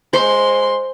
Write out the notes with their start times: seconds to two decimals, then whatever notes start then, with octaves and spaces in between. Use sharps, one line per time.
0.13 G#3 C5 C6